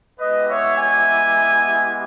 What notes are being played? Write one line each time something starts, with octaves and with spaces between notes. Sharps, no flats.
G#3 B3 E4 G4 B4 D#5
C#5 E5
E5 G#5